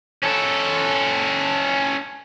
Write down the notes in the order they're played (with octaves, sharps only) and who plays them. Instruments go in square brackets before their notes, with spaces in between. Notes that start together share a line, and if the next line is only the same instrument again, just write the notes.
[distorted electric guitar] C#4 A4